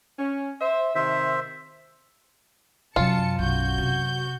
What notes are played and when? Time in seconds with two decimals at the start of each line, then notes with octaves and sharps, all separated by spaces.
0.19 C#4
0.61 C5 E5
0.95 C3 D#3 C5 E5
2.96 F#2 C3 F#3 C#4 F4 A5 C#7
3.39 B1 F#4 G6
3.78 C3